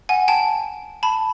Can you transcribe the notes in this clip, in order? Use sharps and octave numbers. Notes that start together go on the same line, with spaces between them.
F#5 G#5
G5 A5
A5 B5